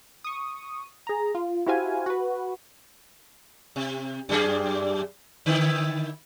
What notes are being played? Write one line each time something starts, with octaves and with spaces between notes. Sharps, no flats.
C#6 D#6
G#4 A#5
F4
E4 F#4 G4 C5 F5 G#5
F#4 B4
C3
F#2 G3 G#4
D3 D#3 E4